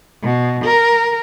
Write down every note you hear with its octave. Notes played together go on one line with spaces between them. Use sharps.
B2
A#4